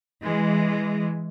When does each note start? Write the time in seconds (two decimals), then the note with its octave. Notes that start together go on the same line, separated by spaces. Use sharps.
0.23 E3 G#3